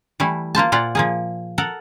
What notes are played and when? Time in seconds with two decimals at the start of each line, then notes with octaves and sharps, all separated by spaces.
0.20 E3 G3 A3 E4
0.55 A#3 F4 C5 A5
0.72 A#2 F4 D5 F#5
0.95 F3 A#3 G#4
1.58 A4 A#4 F#5